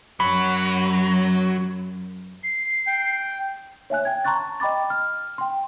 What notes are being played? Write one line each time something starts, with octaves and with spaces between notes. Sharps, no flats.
F#2 F#3 B5
C7
G5
C#5 E5 G#5 F#6
G5 G#6
A5 A#5 C6 C#6 F#6 A6
D#5 G5 B5 D6 A6
F6
G5 C6